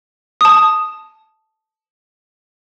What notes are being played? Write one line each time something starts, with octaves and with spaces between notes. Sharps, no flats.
A5 D#6